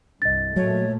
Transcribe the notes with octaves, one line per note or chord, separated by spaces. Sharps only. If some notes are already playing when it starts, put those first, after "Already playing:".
C2 G2 D#5 A6
A#2 F#3 A3 C#5